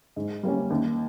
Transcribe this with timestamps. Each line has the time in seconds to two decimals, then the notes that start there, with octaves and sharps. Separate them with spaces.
0.16 G#2
0.43 G3 A#3 C#4
0.70 D#2